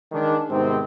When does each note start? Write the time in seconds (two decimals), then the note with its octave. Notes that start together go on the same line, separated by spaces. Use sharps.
0.12 D#3 G#3 D4
0.50 G#2 C3 D#3 B3 C4